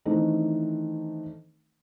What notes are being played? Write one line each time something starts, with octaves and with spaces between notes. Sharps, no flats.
D#3 E3 A3 C4 D4 D#4